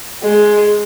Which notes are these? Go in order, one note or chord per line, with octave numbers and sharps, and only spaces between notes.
G#3